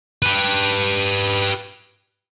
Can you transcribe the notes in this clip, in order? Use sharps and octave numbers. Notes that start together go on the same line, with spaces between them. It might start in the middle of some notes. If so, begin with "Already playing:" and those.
G4 B4